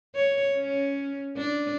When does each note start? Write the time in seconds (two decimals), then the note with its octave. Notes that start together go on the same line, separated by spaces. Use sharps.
0.15 C#5
0.56 C#4
1.37 D4